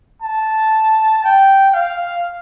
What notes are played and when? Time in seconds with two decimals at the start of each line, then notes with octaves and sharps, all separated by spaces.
0.22 A5
1.24 G5
1.74 F5